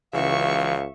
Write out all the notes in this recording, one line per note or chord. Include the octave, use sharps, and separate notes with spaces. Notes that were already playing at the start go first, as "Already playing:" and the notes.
C#2 C#3 E3 F#4 E5 F5 C#6